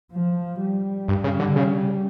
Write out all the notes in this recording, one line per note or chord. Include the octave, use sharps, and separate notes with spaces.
F3
G3
G2
C#3
D3
C#3